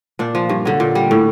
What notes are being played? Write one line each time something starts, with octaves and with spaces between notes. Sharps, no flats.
A#2 D4
F3
G2
D3 F#3
A#2
G3
A2